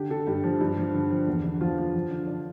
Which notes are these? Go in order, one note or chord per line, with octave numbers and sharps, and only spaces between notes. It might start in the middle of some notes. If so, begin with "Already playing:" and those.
Already playing: D3 G4
D3 A4
G2 G4
F3
G2
F3
D3
F3
E2
D3
F3 F4
F3
F3
D3
D4